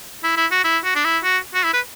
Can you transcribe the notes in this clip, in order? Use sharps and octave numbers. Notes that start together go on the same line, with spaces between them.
E4
E4
F#4
E4
F#4
D4
E4
F#4
F#4
E4
B4